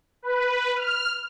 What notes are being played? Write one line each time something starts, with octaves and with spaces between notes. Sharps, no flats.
B4
F6